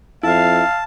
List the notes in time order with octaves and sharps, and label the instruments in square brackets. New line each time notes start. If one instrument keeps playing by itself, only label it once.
[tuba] F2 [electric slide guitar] E4 E5 [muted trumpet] F5 [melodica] A5